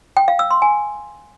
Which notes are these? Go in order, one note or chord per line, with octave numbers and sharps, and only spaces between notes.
G5
F5
E6
C6
G#5